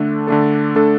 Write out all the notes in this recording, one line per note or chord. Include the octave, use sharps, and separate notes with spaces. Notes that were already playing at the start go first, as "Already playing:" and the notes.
Already playing: D3 A3 D4 A4
D3 A3 D4 A4
D3 A3 D4 A4